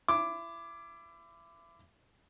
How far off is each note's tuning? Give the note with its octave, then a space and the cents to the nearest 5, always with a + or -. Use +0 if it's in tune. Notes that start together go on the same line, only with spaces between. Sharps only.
E4 +30 D6 +0